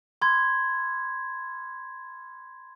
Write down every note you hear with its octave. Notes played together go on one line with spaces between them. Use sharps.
B5 C6 G#6